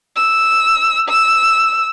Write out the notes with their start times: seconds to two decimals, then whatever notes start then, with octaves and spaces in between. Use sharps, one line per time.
0.16 E6
1.09 E6